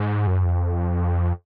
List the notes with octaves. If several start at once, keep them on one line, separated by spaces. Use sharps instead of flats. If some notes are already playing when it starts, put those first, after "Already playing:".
Already playing: G#2
F#2
F2